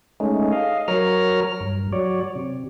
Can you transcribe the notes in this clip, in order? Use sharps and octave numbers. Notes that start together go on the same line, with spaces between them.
G#3 A3 C#4 D#4
D#5 F5
F#3 A#4 C#5 A#5 F6
G2
F#3 C#5 D5
C3